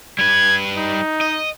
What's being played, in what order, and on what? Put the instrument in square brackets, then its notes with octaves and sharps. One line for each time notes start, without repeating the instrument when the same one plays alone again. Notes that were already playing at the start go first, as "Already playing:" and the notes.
[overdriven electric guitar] G3 B4 [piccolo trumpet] G#6
[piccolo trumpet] D#4
[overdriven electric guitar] D#5